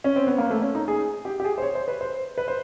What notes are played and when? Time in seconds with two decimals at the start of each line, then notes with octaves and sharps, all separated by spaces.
0.04 C#4
0.16 C4
0.27 B3
0.38 A#3
0.50 A3
0.62 C#4
0.75 D#4
0.88 G#4
1.25 G4
1.40 G4
1.45 G#4
1.58 C5
1.62 C#5
1.75 C5
1.88 B4
2.01 C5
2.38 B4
2.48 C5